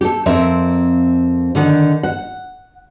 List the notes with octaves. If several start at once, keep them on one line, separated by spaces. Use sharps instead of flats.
G4 A4
F2 C4 A#4 E5
D3 D#3 F#5
F#5